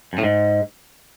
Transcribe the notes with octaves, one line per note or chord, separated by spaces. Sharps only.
F#2
A2
G#2